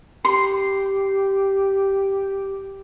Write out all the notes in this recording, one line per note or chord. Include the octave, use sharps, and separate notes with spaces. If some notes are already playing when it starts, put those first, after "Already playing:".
G4 C6